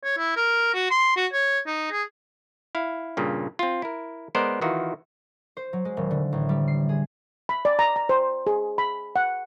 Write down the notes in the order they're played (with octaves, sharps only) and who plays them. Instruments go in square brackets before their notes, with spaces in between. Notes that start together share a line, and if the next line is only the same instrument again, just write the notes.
[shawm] C#5
E4
A#4
F#4
C6
F#4
C#5
D#4
G#4
[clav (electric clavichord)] E4 F5
G2 A#2 C#3
C4 F4
E4 A#4
G#3 B3 A#4 C5 D5
D#3 E3 F4 F#4 A#4
[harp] C5
F#3
G#3
D#1
D3
A1
G3
C7
G#4
[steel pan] B5
D5
A#5
A#5
C5
G#4
B5
F#5